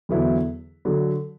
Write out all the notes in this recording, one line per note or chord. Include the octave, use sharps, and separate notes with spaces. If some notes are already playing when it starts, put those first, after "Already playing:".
E2 D3 F#3 B3 E4
D3 F#3